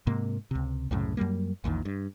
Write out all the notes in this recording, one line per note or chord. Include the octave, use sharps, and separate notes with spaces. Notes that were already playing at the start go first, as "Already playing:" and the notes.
G#2 C3 A#3
C#2 C3
C2 F#2 A2 C#3
F#2 F#3 G3 A#3
A#1 E2 A#2 D#3
G2